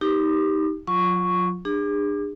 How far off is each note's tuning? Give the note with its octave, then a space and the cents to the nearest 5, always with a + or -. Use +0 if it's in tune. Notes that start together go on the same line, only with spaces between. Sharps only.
D#4 +15 G4 +0 D6 +40
F#3 -35 F4 +0 C#6 +0
D4 +30 G#4 -35